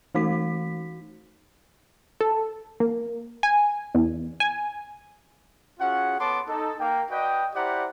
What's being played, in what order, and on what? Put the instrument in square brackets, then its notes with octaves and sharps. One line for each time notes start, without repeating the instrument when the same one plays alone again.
[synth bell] E3 A3 D#4 F#4 B6
[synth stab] A4
A#3
G#5
E2
G#5
[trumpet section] C#4 F4 F#4 G#4 F#5
B3 A4 C#5 A5 C6 D6
D#4 A4
A#3 G5
F#4 B4 D5 D#5 G5
E4 G4 C5 D5 F#5 A#5